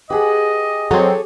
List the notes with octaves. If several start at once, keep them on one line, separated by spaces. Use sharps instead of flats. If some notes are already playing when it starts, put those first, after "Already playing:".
G4 G#4 B4 D#5 F#5
F#3 C4 G#4 A4 C#5